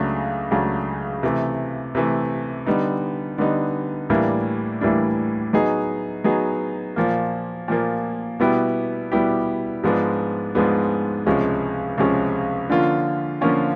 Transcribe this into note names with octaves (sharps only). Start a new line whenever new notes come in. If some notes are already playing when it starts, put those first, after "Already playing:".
Already playing: C#2 C#3 F#3 A3 D4
C#2 C#3 F#3 A3 D4
C3 E3 A3
C3 E3 A3
D3 G3 B3 D#4
D3 G3 B3 D#4
A2 E3 G3 A#3 D4
A2 E3 G3 A#3 D4
F#3 B3 D#4 G#4
F#3 B3 D#4 G#4
A#2 F3 A#3
A#2 F3 A#3
B2 G3 B3 E4 G4
B2 G3 B3 E4 G4
G#2 F3 G#3 B3 D4
G#2 F3 G#3 B3 D4
C#2 C3 F3 G#3 C#4
C#2 C3 F3 G#3 C#4
D3 F3 A#3 C#4 F4
D3 F3 A#3 C#4 F4